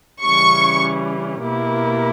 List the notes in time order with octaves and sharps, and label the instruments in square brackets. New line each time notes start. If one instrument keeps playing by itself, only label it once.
[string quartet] C#3 E3 G3 C#4 [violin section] C#6
[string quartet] B2 A#3 E4 G4 A#4